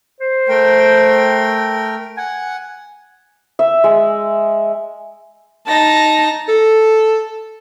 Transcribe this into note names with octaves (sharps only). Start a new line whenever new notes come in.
C5
A3 A#4 G5
F#5 G#5
E5
G#3
D#4 A5 A#6
A4